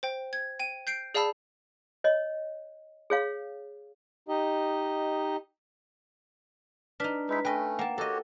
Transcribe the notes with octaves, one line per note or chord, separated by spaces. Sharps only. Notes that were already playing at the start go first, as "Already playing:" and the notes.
C5 G5
G#6
G5 D#7
G6 C7 D7
G#4 D5 F5 A5 B5 E6
C#5 D#5
G#4 C#5 F5
D#4 G4 D#5
D4 D#4 B4 F6 B6
G#3 D#4 E4 B4 B6
A3 C#4 B4 D#5 G5
A#3 F#5 G5 A5
F#4 G4 A4 C#5 D#5